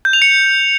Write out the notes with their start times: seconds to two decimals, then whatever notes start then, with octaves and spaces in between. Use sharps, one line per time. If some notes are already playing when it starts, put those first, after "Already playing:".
0.05 G6
0.13 F7
0.22 C#7